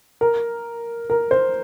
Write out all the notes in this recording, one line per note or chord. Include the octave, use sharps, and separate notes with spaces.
A#4
A#4
C5